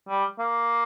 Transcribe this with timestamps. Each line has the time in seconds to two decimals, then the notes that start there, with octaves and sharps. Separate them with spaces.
0.09 G3
0.39 A#3